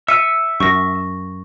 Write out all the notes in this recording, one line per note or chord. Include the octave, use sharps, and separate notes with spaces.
E5 E6 C#7 D#7
F#2 C#6 A#6